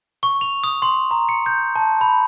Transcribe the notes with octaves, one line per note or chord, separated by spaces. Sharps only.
C#6
F7
D#6
C6
A#5
C#7
G6
A5
B5